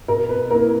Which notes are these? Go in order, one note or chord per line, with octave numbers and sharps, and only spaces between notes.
B2 A#4
B4
A#3 E4 A#4